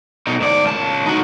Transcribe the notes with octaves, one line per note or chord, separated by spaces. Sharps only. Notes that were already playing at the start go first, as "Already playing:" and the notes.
B2 D#4
G#2 D5
C#2 A5
D#4 F#4